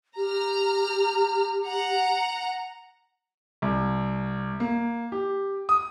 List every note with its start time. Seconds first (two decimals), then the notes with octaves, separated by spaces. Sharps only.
0.17 G4 A#5 F6
1.67 F#5 A#5
3.62 C2
4.60 A#3
5.12 G4
5.69 D#6